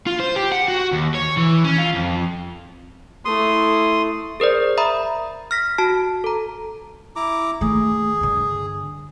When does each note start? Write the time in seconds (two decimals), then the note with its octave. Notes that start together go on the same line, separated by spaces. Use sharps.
0.07 F4
0.20 C5
0.36 G4
0.52 F#5
0.68 F#4
0.93 D#2
1.15 C#5
1.37 E3
1.64 C#4
1.78 F4
1.95 F2
3.25 A3 E4 C6 D#6
4.40 G#4 A#4 C5 D5
4.78 E5 A#5 B5 D#6
5.51 F6 A#6 B6
5.78 F#4 A5
6.24 A4 A#5
7.16 E4 A#5 D6
7.61 D#3 A3 G#4
8.21 G2 D3